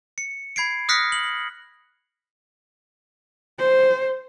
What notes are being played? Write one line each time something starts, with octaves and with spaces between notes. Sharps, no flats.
C#7
B5 G#6 C7 D7
D#6 F6 F#6 A#6 B6 C#7
F#7
C5